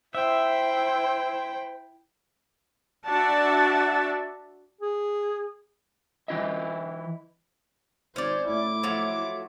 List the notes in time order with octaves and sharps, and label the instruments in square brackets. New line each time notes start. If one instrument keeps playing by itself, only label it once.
[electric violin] E4 G5 [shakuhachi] C5 [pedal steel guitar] E5
[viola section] D4 F#4 D5 E5 F#5 A5
[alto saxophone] G#4
[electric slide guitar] E3 A3 D#4 E4 D#5 E5
[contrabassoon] G#1 [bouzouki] C#4 D5 [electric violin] C5
[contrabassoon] A2 [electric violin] E4 D6
[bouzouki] F3 F#3 A3